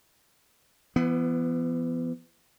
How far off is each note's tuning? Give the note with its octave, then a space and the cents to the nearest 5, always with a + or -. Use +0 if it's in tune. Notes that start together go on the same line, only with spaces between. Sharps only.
E3 +40 B3 +10